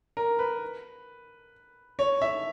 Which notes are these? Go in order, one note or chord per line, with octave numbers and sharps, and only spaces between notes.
A#4
B4
C#5
E5